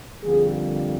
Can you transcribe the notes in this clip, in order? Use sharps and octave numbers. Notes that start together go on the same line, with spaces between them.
F2 D3 G3 A#3 G#4